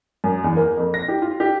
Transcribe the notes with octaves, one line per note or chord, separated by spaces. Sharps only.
F#2
E2
A#3
F2
A#6
G4
F4
G4